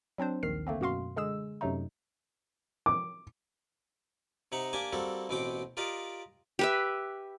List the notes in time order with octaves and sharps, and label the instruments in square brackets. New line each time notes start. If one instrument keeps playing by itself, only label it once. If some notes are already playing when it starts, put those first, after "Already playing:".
[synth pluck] F#3 C4 D4 C5
A#1 D#2 D#3 F6 C7
D3 A3 A#3 C4
F#2 B2 F#4 F5 C6
D3 G#3 G#4 E6
F#2 C3 F#3 A3 D#4
[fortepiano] D6
[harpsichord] C3 D#4 F#5 A#5
A#3 D4 G4 G#5 D6
G3 A#3 C4 F#4 A4
A1 B2 C4 F#4 G5 D6
F4 G4 A#4 D5 D#5 F5
[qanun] G4 B4 E5